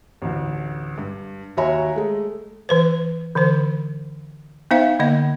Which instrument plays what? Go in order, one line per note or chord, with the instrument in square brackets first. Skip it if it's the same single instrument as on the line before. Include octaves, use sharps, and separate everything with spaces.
[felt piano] A1 D2
G2
D#2 F#4 C#5 E5 G#5 A#5
G#3 A3
[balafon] E3 B4 C5
D3 E3 C5
B3 D#4 C5 E5 F5
D3 A#3 D#5